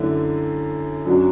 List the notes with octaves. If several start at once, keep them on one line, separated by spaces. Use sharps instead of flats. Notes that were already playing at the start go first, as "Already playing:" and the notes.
Already playing: F#2 D3 A3 E4
F#2 F#3 D4 F#4